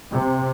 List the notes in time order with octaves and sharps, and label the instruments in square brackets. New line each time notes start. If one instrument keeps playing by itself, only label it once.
[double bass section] C3